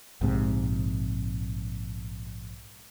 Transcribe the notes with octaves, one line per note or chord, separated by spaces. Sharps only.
A#1 G#2 C3